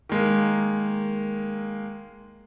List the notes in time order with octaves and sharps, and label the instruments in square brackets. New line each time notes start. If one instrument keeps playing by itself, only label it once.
[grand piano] D#3 G#3 A#3